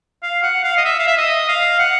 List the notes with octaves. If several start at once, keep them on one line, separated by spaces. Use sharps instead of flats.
F5
F#5
F5
D#5
E5
F5
E5
D#5
F5
F#5